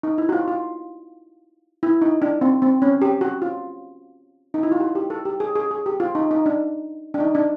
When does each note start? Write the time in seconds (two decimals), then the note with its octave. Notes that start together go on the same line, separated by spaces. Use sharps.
0.03 D#4
0.18 E4
0.29 F#4
0.32 F4
0.48 F4
1.83 E4
2.02 D#4
2.22 D4
2.41 C4
2.62 C4
2.82 C#4
3.02 G4
3.21 F#4
3.42 F4
4.54 D#4
4.63 E4
4.72 F4
4.80 F#4
4.95 G4
5.10 A4
5.25 G4
5.40 G#4
5.55 G#4
5.71 G#4
5.86 G4
6.00 F4
6.15 D#4
6.31 D#4
6.46 D4
7.14 D4
7.20 D#4
7.35 D4